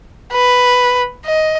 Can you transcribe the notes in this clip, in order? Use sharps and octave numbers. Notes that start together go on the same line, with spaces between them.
B4
D#5